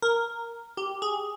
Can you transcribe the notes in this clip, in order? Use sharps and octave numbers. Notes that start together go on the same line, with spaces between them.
A#4
G4
G#4